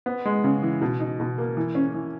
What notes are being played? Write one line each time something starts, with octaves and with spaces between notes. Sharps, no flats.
B3
G#3
C#3
E3
B2
D#4
B2
A#3
E3
C#4
E3